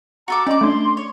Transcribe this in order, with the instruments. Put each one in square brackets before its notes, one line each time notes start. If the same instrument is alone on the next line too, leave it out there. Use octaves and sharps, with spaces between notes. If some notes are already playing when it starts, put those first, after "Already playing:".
[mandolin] F#4 A4 D6 [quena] A#5
[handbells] C#4 [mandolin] D5 D6 [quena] D#5
[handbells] A3 D4 [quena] C6
[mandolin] C#5